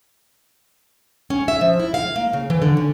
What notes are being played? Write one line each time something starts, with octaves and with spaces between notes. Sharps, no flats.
C#4
E5
F3
E4
F5
A#3
C#3
E3
D3
C#4